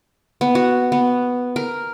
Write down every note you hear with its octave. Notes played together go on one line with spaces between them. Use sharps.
B3
F#4
B3
A#4